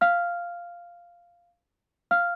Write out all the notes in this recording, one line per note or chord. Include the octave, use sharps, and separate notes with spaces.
F5 F6
F5 F6